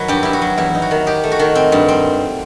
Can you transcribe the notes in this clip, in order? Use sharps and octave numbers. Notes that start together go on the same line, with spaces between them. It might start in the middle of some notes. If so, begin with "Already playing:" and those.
Already playing: D#3 F#3 B4
G2 G4
G2 E4
F#4
F#3
E2 E4
D#4
F#4
D#3
D#4 G4
A3
F#4
D#3
C4
G2
C4